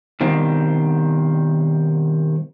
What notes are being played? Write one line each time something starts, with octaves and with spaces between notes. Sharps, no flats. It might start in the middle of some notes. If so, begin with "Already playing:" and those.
B2 D#3 G3 C4